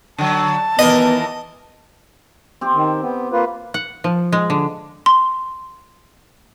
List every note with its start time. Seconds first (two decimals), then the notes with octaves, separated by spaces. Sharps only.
0.18 D3 F#3 A5
0.79 D#2 E3 B3 A#4 D#5
2.61 C4 G4
2.73 D#3
3.02 B3
3.32 A#3 F4 B4
3.74 F#5
4.04 F3
4.33 G#3
4.50 D3
5.06 C6